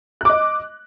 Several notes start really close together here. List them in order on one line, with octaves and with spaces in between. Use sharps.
F#6 D6 D#5